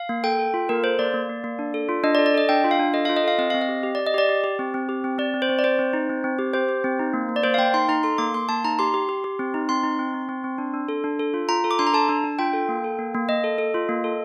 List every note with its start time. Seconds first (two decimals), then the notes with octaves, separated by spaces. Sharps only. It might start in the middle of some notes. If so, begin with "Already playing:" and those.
Already playing: F5
0.09 A#3
0.24 A4 G5
0.39 A4
0.54 F4
0.69 A#3 A#4
0.84 A4 C5
0.99 A#3 D5
1.14 A#3
1.29 A#3
1.44 A#3
1.59 D4
1.74 A4
1.89 F4
2.04 D4 D#5
2.15 D5
2.18 A4
2.26 D5
2.34 A4 D#5
2.49 D4 G5
2.64 F4
2.71 F5
2.79 D4
2.93 A4 D#5
3.05 F4 F5
3.17 D#5
3.24 A4 F5
3.38 C4 D#5
3.50 C4 F5
3.62 D#5
3.69 G4
3.83 G4
3.95 G4 D5
4.06 D#5
4.14 G4 D5
4.29 G4
4.44 G4
4.59 C4
4.74 C4
4.89 G4
5.04 C4
5.18 C4 D5
5.34 C4
5.42 C5
5.49 C4
5.59 D5
5.64 C4 C5
5.79 C4
5.93 D#4
6.09 C4
6.24 C4
6.39 G4
6.53 G4 C5
6.69 G4
6.84 C4
6.99 D#4
7.13 A#3
7.29 A#3
7.36 D5
7.44 A#3 C5
7.54 F5
7.58 A#3 G5
7.74 D#4 C6
7.89 D#4 A#5
8.03 A4 C6
8.18 A#3 D6
8.34 A#3 C6
8.49 A#3 A5
8.64 D#4 A#5
8.79 G4 C6
8.94 G4
9.09 G4
9.24 G4
9.39 C4
9.54 D#4
9.69 C4 C6
9.83 D#4
9.99 C4
10.14 C4
10.29 C4
10.44 C4
10.58 D4
10.74 D4
10.89 A4
11.04 D4
11.19 A4
11.34 F4
11.49 F4 A#5
11.64 A4
11.71 D6
11.79 D4 C6
11.87 A#5
11.94 A4 A5
12.09 D4
12.24 D4
12.39 F4 G5
12.53 A4
12.69 A#3
12.84 A4
12.99 A#3
13.14 A#3
13.29 A#3 D#5
13.44 A4
13.58 A4
13.74 F4
13.89 A#3
14.04 A4